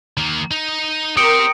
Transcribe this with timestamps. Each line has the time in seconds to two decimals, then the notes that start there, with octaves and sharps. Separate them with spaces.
0.18 D#3 A#3
0.51 D#4
1.17 C4 G4 A#4 C5 D#6 C#7 D7